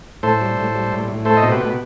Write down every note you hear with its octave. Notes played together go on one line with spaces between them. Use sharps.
A2 A4 C5
G3
A2
G3
A2
A2
A3 A4 C5
D#5
B2 C5
G4 B4
B2